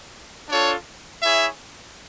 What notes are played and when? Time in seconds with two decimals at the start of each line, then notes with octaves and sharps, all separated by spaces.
0.49 D4 F4 A4 C#5
1.23 E4 G#4 C#5 E5